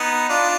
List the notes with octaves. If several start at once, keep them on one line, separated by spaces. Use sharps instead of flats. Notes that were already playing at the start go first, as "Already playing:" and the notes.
Already playing: B3 D#4
D4 F4